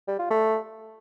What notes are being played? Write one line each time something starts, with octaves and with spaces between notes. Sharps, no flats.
G3
F4
A3